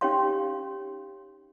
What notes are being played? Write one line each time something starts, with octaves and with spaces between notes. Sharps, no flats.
C#4 D#4 G4 C#5 F5 C6